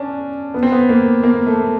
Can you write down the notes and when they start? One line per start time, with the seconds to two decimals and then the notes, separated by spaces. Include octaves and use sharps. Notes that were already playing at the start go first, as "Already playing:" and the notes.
Already playing: C#4 D4
0.54 B3
0.63 C4
0.72 B3
0.89 A#3
1.23 A#3
1.46 A3